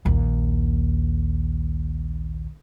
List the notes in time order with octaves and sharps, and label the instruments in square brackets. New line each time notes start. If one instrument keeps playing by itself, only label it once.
[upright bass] A#1 D#2